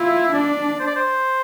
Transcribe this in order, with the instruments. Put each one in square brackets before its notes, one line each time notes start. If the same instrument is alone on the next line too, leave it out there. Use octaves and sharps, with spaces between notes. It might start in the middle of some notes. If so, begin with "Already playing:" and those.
Already playing: [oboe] E4 [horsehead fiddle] F4
[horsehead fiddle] D4 [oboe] D5
[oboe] C5
D5
C5